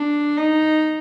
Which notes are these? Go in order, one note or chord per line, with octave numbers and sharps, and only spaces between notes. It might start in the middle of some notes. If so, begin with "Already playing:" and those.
Already playing: D4
D#4